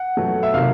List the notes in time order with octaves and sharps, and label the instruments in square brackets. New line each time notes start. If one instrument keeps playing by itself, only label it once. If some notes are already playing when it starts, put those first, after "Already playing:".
Already playing: [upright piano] F#5
B2 F#3 A3
E5
C3 D#3 F#3 A#3 F5